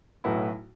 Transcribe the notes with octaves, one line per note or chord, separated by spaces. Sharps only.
B1 A2 F#3 B3 E4